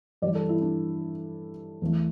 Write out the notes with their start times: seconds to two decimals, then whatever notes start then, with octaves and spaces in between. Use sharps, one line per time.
0.22 G2 E3 G3 D5
0.35 A4
0.49 E4
0.62 D4
1.82 E2 E3 A3